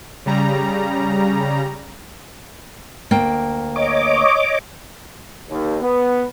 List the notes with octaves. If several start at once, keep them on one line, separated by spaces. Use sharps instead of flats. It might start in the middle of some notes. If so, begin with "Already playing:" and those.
C#3 G3 A#5
D2 A#3 G5
C#5 D#5 D6
D#2
B3